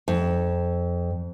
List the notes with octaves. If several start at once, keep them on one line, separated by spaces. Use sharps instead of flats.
F2